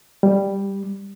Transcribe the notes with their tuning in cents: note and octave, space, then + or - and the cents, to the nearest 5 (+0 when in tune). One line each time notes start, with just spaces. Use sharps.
G3 +5